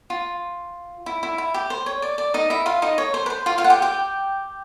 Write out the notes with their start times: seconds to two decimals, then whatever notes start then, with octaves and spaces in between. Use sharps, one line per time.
0.10 F4
1.06 E4
1.23 E4
1.38 E4
1.54 G4
1.70 C5
1.86 C#5
2.02 D5
2.18 D5
2.34 D#4 D#5
2.50 E4 E5
2.66 F4 F5
2.82 D#4 D#5
2.98 C#5
3.14 C5
3.26 B4
3.30 C5
3.46 F4 F5
3.58 F4 F5
3.64 F#5
3.70 G4 G5
3.82 G4 G5